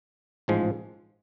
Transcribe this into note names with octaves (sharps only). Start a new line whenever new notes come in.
A1 G#2 F3 G#3